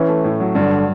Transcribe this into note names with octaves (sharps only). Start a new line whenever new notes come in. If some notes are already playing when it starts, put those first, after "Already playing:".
Already playing: E3 C#4
A3
A2
F#3
G2 D3